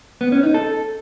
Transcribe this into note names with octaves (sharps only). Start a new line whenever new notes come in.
B3
C#4
D#4
A4